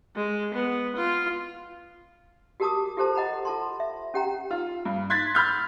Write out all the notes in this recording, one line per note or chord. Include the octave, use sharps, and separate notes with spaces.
G#3
B3
F4
F#4 G4 A#4 A5 D6 D#6
F4 G4 A4 C5 A5
D#5 F#5 A#5 B5
F4 A4 A5 C6
E5
C#4 G4 F#5 G5 A#5
F4
G2
C6 F#6 G#6 A6 B6
B5 F6 G6